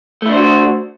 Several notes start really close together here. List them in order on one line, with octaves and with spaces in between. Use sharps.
A3 E4 D4 C5 F#4